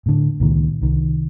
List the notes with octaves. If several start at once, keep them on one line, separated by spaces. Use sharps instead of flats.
A2 D3
C#2 A#2 D#3
C2 D#3